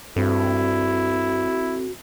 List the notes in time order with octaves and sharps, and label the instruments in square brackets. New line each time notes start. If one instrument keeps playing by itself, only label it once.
[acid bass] G2 [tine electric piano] C4 A4 [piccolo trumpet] E4 [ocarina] F#4